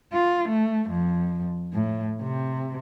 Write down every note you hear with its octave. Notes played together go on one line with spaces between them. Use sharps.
F4
A3
F2
A2
C3